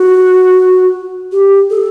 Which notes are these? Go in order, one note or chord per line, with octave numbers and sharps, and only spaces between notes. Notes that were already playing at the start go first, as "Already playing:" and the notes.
Already playing: F#4
G4
A4